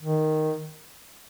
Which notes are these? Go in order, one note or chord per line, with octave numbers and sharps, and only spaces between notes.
D#3